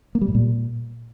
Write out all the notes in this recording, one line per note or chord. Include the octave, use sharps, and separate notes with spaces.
A#3
G3
G#2
A#2